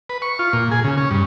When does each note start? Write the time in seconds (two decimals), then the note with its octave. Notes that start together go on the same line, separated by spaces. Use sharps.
0.09 B4
0.22 C#6
0.39 F4
0.53 A#2
0.71 G#4
0.84 C#3
0.97 C#4
1.11 G2